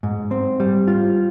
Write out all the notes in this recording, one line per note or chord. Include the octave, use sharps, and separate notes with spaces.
G#2
C4
G3
F4